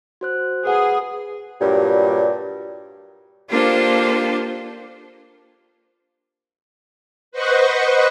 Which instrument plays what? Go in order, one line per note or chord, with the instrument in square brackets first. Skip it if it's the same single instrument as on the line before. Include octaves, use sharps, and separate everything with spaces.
[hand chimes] F#4 C5 F#6
[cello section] G#4 [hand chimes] B4 F#5 G#5
[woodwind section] G2 A#2 F#3 G3
[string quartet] A#3 D4 F4 G4 A4 C5
[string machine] B4 C5 D#5 F#5 C#6